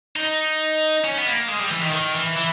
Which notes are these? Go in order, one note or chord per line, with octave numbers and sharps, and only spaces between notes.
D#4
C#4
B3
A#3
G#3
G3
E3
D#3
D#3
E3
E3